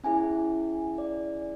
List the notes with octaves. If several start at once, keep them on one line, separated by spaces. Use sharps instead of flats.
C#4 E4 G#4 G#5
D5